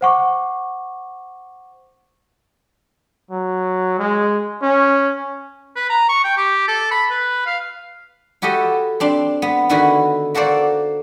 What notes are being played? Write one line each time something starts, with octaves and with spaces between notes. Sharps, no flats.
C5 F#5 C#6 D6
F#3
G#3
C#4
B4
A#5
C#6
G5
G4
A4
B5
B4
F5
E4 F#4 G4 A4 D#5
C4 D4 C6
B3
D3 D#3 E4 F#4 G#4 B4
A#3 F#4 A4 C5 D5